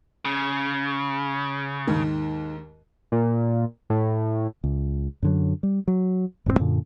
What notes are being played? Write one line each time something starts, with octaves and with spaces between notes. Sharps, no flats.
C#3
D#2 G#2 D#3
A#2
A2
C#2
F#2 D3 F#3
G3
F#3
E1 G#2 G3 C4
F#2 A#2 D3